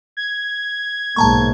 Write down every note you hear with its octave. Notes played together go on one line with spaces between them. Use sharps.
G#6
B1 G#2 A#3 A5 A#5 C#6